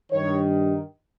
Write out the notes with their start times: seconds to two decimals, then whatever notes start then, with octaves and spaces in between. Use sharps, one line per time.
0.12 G2 D#3 C#5